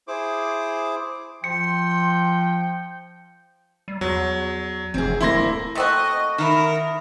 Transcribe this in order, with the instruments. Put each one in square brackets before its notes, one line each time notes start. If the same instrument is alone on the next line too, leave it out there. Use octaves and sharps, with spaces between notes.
[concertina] E4 G#4 C5 D6
[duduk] F3 [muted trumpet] G5 [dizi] C6 [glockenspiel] C#7
[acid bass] G3
[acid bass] E2 [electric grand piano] F#3
[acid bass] F1 [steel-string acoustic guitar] C4 G#4
[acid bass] D1 [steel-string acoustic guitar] D2 A#3 [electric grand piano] E4 C6 A#6
[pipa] A3 C4 F#4 [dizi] D#5
[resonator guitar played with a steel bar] D#3 E4 [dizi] A#4